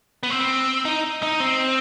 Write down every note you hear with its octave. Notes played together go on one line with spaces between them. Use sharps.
B3
C4
D#4
D#4
C4